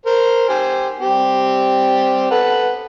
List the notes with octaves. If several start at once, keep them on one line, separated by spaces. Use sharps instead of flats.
A#4 C5
G4 C5 G#5
G3 C4 G4
A4 B4 F#5